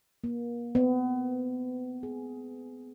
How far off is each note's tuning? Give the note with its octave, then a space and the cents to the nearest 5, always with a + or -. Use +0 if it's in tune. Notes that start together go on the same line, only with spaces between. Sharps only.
A#3 +35
B3 +35
G#4 +15